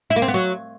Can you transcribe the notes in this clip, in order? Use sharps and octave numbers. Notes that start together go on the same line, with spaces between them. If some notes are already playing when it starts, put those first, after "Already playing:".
E4
A#3
C4
B3
F#3